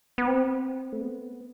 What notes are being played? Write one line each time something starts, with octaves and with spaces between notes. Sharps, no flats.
B3
C4
A3
B3